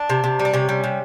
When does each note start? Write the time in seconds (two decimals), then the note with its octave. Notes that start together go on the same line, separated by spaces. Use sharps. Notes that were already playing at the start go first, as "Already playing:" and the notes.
Already playing: D4
0.09 C3
0.24 C3
0.39 G3
0.45 D4
0.53 C3 C#4
0.69 G3
0.84 C3